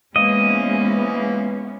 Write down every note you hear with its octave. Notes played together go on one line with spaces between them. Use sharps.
E3 F3 G#3 A#3 B3 C#4 D#5